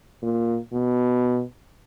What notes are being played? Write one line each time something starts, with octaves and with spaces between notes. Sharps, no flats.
A#2
B2